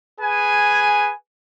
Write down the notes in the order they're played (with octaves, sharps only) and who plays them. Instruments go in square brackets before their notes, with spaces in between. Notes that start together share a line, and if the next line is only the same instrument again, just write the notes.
[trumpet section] G#4 B4 G#5